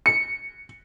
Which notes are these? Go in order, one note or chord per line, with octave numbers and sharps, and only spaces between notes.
C#7